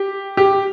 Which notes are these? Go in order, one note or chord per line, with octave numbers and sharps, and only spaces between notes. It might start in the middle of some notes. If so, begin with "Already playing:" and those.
Already playing: G4
G4